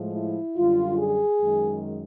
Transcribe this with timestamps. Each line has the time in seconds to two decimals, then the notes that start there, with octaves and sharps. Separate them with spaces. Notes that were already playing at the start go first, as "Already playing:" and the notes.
Already playing: A2 F3 G#3
0.14 E4
0.57 F#2 D3 G3 F4
0.98 G#4
1.41 F#2 D#3 G#3